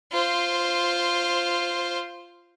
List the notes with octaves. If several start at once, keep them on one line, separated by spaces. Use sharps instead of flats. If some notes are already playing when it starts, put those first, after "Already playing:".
F4 C5